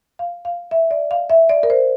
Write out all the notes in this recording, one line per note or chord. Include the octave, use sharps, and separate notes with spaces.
F5
F5
E5
D5
F5
E5
D5
A#4
C5